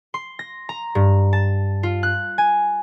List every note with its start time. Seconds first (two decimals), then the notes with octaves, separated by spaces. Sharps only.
0.14 C6
0.39 A#6
0.69 A#5
0.95 G2
1.33 A5
1.83 F4
2.03 F#6
2.38 G#5